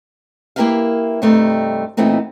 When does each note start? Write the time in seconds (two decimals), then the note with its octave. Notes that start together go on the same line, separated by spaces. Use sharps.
0.56 A#3 E4 G4 A#4 B4 F5
1.22 G2 C3 G3 A3 D#4
1.97 A#2 E3 A3 B3 C4 D#4